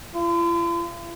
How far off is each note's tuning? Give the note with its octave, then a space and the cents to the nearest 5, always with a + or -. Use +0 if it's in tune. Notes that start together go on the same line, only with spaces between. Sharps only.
F4 -45